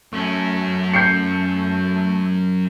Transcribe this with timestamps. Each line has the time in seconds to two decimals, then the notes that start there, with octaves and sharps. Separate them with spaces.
0.13 F#2 A3 C#4
0.94 G6 C7 C#7